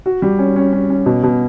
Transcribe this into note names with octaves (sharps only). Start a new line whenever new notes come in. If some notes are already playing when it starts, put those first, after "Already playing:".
F#4
G3
C#4
C#4
C#4
C#4
B2
B2